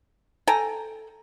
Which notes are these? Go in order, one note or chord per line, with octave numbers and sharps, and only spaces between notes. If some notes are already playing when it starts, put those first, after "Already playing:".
A4 G5 G#5 A#5